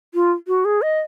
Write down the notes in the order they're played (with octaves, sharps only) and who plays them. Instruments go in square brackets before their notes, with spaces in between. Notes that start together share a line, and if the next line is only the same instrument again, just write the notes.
[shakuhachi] F4
F#4
G#4
D#5